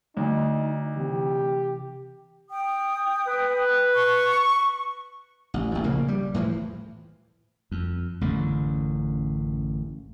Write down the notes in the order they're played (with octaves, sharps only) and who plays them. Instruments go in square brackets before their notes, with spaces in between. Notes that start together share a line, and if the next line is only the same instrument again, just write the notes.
[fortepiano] D2 [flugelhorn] D#4
[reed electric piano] C3 E3 [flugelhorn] G4
[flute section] G5 D#6
[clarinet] B4
[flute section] C#6
[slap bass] A1
A1 F#2
A#1 C#3 A#3
G3
A2 E3 F3
F2
A1 F#2 D3